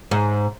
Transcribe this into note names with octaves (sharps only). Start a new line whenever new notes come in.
G#2